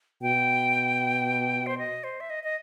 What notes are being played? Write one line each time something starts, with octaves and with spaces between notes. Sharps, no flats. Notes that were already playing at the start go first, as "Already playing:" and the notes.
B2 G5
C5
D#5
C5
E5
D#5
D#5